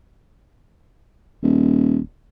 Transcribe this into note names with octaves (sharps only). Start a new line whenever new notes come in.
D#1